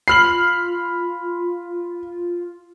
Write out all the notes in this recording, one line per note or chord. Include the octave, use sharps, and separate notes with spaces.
F4 B5 F6 C7 F#7